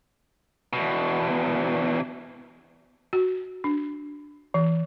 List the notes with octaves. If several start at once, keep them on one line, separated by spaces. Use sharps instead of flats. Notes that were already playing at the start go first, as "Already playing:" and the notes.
E2 B2
F#4
D4
E3